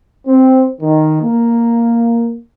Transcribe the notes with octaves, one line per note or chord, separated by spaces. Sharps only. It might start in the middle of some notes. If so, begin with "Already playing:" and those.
C4
D#3
A#3